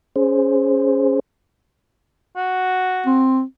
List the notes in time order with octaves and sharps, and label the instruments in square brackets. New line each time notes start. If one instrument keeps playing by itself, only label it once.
[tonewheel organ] C#4 G#4 C5
[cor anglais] F#4
[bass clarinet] C4